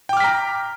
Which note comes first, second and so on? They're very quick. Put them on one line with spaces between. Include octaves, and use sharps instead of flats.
G5 D6 F6 B6 A#5